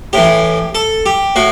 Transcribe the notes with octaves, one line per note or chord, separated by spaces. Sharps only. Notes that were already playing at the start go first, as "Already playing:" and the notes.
A2 E3 G4
A4
G4
A2 F#4